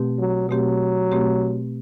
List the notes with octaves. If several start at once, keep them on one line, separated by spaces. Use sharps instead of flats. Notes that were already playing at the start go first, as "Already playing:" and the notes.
Already playing: B2 A3 C4 G4
F#3
B2 F#3 A3 C4 G4
B2 A3 C4 G4